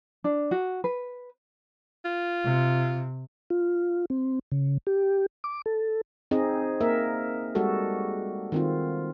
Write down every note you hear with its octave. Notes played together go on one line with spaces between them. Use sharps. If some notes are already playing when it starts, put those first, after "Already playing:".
D4
F#4
B4
F4
C3
F4
C4
C#3
G4
D6
A4
C4 D#4 G#4 D#5
A#3 A#4 E5
G3 G#3 F#4 A4
D#3 C4 F4